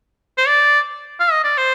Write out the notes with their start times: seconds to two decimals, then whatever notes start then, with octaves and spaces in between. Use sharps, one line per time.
0.38 C5
0.47 D5
1.20 F5
1.32 D#5
1.44 D5
1.57 C5